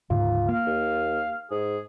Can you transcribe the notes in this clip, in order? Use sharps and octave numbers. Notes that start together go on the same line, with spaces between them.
D1 G#2 C#3 F4
A#3 F5
D#2
G#2 G#4